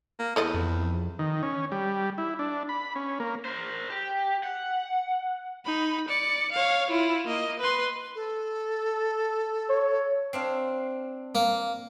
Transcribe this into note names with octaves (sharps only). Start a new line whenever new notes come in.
A#3
E2 A4 D5 D#5
F2
D#3
C#4
G3
E4
D4
B5
C#4
A#3
A#4 C5
G4
F#5
D#4 B5
D5 C#7
C#5 F5
E4 F4
A#3 D#5
B4 C6
A4
C#5
C4 D4 F5
A#3